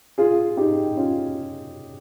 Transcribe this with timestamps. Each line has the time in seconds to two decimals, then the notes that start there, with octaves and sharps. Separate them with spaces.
0.18 F4 G#4
0.57 D#4 G4
0.96 C#4 F4